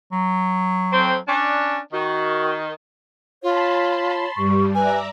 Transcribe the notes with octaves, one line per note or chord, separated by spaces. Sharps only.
F#3
F2 C4
C#4 D4
D#3 F#4
F4 C#5 A5 B5 C6
G2 G3 C#6
B4 D5 E5 G#5 A#5